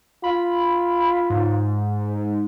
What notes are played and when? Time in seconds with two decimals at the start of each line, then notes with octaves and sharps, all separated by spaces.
0.24 F4 B5
1.30 G#2